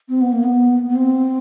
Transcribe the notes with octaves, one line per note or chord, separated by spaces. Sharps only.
C4
B3
A#3
B3
B3
C4